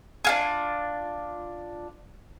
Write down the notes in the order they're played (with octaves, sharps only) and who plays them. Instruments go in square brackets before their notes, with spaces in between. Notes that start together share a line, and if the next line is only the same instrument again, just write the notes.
[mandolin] D4 F4 G#4